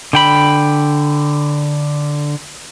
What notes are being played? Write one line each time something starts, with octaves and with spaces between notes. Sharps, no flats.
D3 G5 B5